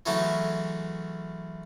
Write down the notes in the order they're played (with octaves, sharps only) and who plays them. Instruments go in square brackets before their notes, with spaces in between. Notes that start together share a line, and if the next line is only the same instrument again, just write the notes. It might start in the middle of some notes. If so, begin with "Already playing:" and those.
[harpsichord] E3 F#3 G#3 A3 C#4 E4